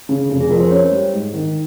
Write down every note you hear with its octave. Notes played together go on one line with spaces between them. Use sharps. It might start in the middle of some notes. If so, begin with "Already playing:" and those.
C#3
F1
G#4
F2 A#4
C5
C#4 C#5
G3
G#2
D#3